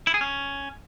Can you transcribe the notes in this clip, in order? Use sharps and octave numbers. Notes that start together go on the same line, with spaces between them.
E4
G#4
C#4